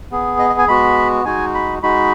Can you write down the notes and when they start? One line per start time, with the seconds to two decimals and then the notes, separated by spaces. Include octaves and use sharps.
0.11 B3 G#4
0.39 D#5
0.50 D#5
0.59 G#5
0.68 G#3 B3 F#4 B5
1.25 G#3 D#4 F#4 G#5
1.54 B5
1.82 G#3 D#4 F#4 B5